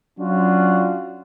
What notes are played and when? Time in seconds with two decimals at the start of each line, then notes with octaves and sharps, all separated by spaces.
0.19 F#3 C#4 D4 F4 F#4